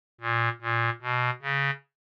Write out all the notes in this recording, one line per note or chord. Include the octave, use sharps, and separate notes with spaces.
A#2
A#2
B2
C#3